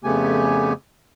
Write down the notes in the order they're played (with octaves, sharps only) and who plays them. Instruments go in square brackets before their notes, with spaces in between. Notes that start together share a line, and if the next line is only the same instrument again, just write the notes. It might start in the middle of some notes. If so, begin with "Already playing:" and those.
[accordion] F2 C#3 A3 B3 G4 G#5